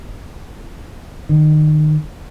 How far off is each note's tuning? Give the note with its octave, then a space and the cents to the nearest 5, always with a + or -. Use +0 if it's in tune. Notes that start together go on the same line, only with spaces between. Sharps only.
D#3 -30